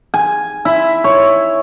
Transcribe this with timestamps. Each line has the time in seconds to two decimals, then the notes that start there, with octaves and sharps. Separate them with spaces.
0.14 G#5
0.65 E4
1.04 C#5